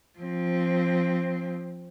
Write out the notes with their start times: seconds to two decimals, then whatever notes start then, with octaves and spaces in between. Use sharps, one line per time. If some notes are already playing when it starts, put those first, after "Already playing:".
0.19 F3 C4